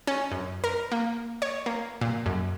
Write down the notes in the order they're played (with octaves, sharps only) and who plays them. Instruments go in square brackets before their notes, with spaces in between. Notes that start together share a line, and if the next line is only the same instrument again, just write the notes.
[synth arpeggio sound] C#4
F#2
A#4
A#3
C#5
A#3
A#2
F#2